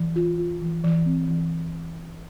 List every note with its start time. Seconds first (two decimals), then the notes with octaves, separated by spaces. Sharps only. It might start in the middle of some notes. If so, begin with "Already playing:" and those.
Already playing: E3
0.16 F4
0.38 F4
0.61 E3
0.84 E3
1.06 C4
1.28 E3